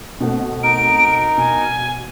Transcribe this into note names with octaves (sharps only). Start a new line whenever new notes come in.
B2 A3 C4
D#4 A#4 D7
B2 G#5